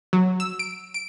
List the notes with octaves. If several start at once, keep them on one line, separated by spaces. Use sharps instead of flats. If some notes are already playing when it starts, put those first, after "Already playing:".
F#3
E6
D7
D7